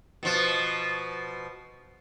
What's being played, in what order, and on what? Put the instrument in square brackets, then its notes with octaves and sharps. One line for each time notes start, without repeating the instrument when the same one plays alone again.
[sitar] B2 F3